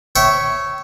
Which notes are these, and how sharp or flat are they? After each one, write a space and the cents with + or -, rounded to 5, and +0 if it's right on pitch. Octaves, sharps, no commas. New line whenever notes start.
C#5 +0 E5 +0 G5 -30